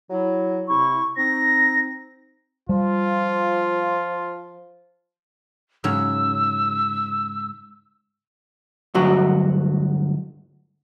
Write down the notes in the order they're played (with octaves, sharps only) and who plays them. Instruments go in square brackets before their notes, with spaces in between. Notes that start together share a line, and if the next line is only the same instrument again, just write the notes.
[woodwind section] F#3 E4
[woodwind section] C3 E4 [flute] C#6
[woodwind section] C4 D#4 [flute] A#6
[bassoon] F3 [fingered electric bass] G3 [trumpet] F4
[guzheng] G#2 C#3 F#3 [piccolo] E6
[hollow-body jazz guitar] D2 G2 F#3 F#4